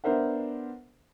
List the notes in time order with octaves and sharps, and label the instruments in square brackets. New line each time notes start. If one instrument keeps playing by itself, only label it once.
[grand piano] B3 D4 A#4 C5 E5 F#5